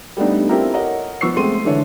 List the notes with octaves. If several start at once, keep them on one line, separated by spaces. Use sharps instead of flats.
G3 A3 B3 D4 D#4
C4 E4 F4 G4 A4 A#4
A#4 C#5 D#5 F#5
F3 B3 C#6 E6 C7
G#3 A3 C4 C6 D#7
D3 E3 A4 B4 C#5